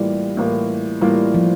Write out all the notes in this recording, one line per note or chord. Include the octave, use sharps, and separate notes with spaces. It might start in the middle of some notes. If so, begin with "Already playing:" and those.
Already playing: A2 E3 G3 A#3 F4 A#4
A2 E3 A#3 F4 A#4
A2 E3 G3 A#3 F4 A#4
F3